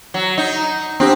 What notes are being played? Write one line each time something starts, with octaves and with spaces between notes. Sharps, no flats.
F#3
D#4
B3 C4 D4 G4